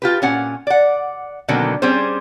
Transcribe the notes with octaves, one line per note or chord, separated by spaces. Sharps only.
F4 G4 B4
A#2 C#4 F#5
D5 F#5
B2 D3 D#3 F#3 A#3 C4
G3 C4 C#4 G#4 C5